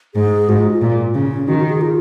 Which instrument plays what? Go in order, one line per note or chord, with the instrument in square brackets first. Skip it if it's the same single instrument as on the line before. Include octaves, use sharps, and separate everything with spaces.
[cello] G#2 [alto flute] G#4
[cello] G#2 [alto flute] F#4
[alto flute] F4
F4
[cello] A#2
[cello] C#3 [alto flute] C#4
[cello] D#3 [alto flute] F#4
[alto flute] F#4
G#4
F4